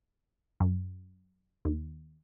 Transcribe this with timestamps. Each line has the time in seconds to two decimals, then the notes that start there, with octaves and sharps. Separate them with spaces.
0.60 F#2
1.65 D#2